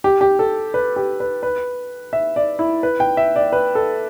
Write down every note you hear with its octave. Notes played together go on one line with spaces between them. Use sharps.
G4
G4
A4
B4
G4
B4
B4
E5
D5
E4
B4
G5
E5
D5
B4
A4